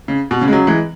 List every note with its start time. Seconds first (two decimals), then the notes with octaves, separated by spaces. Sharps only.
0.08 C#3
0.31 B2
0.41 C#3
0.48 G#3
0.52 C#3 F#3
0.67 E3 G#3